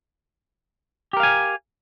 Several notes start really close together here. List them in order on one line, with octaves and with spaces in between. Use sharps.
G4 A#4 F5 G#5